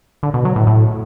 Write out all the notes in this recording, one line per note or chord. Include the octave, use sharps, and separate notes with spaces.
D3
B2
F#3
A2
A2